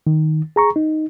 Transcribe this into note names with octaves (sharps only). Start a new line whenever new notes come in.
D#3
G#4 A#5 C#6
D#4